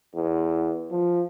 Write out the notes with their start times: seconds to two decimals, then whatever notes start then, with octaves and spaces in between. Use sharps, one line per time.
0.15 E2
0.92 F3